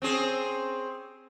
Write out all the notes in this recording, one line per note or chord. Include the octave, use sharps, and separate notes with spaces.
C4 C#4 G#4